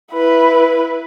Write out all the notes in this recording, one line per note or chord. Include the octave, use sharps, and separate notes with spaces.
E4 B4